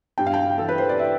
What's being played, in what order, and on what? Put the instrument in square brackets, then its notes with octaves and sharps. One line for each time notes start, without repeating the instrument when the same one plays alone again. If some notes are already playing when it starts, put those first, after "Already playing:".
[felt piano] G2 G5
F5
G5
E3 A4
B4
C5
D5
E5